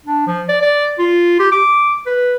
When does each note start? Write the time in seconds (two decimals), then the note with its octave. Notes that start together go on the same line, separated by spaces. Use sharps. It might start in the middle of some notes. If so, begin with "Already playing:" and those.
0.06 D4
0.27 F3
0.49 D5
0.61 D5
0.99 F4
1.39 G4
1.52 D6
2.06 B4